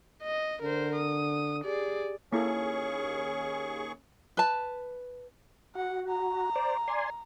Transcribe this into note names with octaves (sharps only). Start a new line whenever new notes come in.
D#5
D3 A#4 C5
D#6
G4 G#4 D5
D#2 A#3 C#4 E4 G#4 A4 C#6
B4 A5
F#4 F#5
A#5
C5 D5
D5 G#5 C6